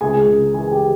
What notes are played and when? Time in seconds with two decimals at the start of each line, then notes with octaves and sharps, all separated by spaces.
0.01 C#2 G#4 G#5
0.27 C#3
0.54 E3 G#4 G#5
0.71 G4 G5